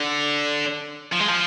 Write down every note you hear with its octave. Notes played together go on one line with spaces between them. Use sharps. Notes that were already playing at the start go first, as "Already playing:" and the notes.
Already playing: D3
F3
G#3
F3